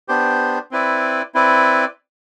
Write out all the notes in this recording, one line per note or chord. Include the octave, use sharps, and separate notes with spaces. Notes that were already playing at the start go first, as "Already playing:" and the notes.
B3 D4 G4 C5
C4 E4 B4 D5
C4 E4 B4 D5